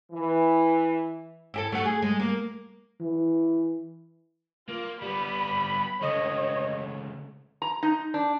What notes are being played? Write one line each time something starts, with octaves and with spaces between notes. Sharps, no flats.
E3
E4 G4 A4
A3 F#4
G#4
G#3
A#3
E3
A#3 F4
G3 B3 B5
C#2 A3 C#5 D#5
A#5
D#4
D4